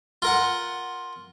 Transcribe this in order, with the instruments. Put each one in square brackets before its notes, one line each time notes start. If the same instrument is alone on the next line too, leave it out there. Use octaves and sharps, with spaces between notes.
[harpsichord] F4 A#4 F#5